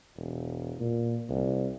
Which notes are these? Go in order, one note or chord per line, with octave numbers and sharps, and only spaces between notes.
E1
A#2
C2